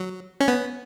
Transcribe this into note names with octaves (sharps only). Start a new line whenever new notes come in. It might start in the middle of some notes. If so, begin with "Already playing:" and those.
Already playing: F#3
C#4
B3